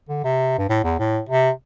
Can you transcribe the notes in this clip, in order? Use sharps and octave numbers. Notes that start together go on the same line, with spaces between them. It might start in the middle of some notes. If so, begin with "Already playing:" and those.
D3
C3
G2
A2
E2
A2
C3